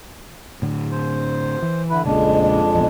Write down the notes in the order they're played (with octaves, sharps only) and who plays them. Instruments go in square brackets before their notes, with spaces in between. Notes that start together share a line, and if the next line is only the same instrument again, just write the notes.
[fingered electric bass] A2 D3
[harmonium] C5
[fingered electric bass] E3
[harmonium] D3 E4 B4
[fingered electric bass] A#1 A#2 C#3 [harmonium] F2 G#3 D4
[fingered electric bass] E1 A#1 B2